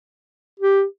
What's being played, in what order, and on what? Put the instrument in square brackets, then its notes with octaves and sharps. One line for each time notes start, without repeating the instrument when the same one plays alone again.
[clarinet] G4